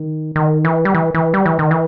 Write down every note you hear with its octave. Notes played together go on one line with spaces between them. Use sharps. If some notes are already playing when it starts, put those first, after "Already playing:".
Already playing: D#3
D#3
E3
G3
E3
E3
G3
E3
D#3
E3